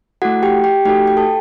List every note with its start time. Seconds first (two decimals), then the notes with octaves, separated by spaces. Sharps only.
0.22 A3 E4 F#4 A4 F#5
0.43 G4 G5
0.64 G4 G5
0.85 A3 D#4 F#4 G4 A4 G5
1.08 G5
1.17 A4 A5